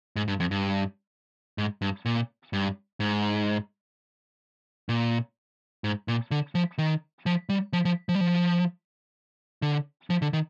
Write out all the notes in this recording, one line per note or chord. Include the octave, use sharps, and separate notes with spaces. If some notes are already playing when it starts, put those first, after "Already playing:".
G#2
G2
F2
G2
G#2
G2
A#2
G2
G#2
A#2
G#2
A#2
D3
F3
D#3
F3
G3
F3
F3
F3
G3
F3
D3
F3
D3
D#3